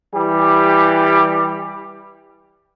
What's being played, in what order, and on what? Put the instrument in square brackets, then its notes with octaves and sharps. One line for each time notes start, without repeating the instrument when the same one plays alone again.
[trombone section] E3 G3 G4